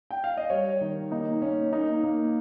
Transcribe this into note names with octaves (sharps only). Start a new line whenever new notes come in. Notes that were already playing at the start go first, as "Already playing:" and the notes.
G5
F5
D#5
G3 C#5
D#3
A#3 D#4
A#3 C#4
A#3 D#4
A#3